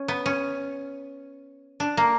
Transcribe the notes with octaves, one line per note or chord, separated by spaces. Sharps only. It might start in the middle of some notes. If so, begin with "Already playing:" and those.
Already playing: C#4
B3
C#4
D4
A#3